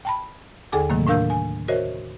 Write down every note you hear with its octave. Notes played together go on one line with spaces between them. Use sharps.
G5 A5 B5
D#2 D3 G#4 A4 G#5 D6
A2 C3 D#3 F#3 A3 A#3
A2 D4 A#4 F5 E6 G6
G#5
F#4 A#4 C5 C#5 D#5 E5